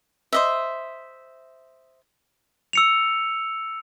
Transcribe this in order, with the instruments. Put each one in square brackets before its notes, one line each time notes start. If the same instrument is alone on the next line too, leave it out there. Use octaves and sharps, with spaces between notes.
[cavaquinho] C5 D#5 E5
[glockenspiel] E6 C#7 F7